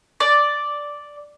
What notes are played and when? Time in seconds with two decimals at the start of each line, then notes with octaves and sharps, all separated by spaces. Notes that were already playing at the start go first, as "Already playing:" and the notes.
0.20 D5